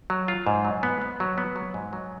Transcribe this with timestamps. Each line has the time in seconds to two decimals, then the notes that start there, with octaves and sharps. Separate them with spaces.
0.10 F#3
0.28 F4
0.47 G#2
0.65 F#3
0.83 B3
1.02 B3
1.20 F#3
1.38 B3
1.56 F#3
1.74 G#2
1.93 F#3